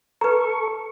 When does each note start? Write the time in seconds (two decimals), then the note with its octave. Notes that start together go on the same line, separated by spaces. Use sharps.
0.21 A4 B4 A#5 C#6